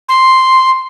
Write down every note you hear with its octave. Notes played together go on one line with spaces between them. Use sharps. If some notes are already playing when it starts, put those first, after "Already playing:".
C6